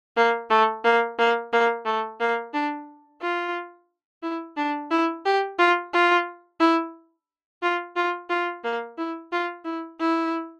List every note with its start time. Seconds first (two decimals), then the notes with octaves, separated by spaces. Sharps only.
0.17 A#3
0.50 A3
0.85 A#3
1.19 A#3
1.53 A#3
1.85 A3
2.20 A#3
2.54 D4
3.21 F4
4.23 E4
4.57 D4
4.91 E4
5.25 G4
5.59 F4
5.93 F4
6.60 E4
7.62 F4
7.96 F4
8.29 F4
8.64 A#3
8.98 E4
9.32 F4
9.65 E4
10.00 E4